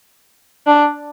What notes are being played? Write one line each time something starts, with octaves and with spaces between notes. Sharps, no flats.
D4